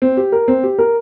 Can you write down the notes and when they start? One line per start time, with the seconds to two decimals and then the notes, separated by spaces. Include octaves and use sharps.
0.02 C4
0.17 G4
0.32 A#4
0.48 C4
0.64 G4
0.79 A#4